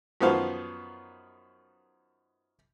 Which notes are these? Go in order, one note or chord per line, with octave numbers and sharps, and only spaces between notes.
F#2 D#3 F3 B3 C5 F5